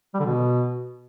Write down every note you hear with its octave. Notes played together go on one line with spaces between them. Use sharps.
G3
D3
B2